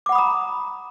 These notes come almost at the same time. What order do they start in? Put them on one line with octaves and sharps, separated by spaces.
D6 F#5 B5 D#6 A#5